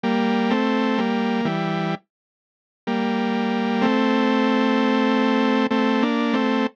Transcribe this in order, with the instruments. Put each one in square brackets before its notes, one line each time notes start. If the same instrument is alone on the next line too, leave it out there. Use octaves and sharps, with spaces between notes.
[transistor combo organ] G3 A#3
A3 C4
G3 A#3
E3 G3
G3 A#3
A3 C4
A3 C4
A#3 D4
A3 C4